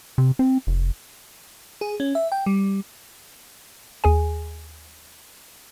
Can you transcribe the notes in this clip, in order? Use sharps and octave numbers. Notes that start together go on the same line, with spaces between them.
C3
C4
F1
G#4
C#4
E5
G5
G3
D#2 G#4 G#5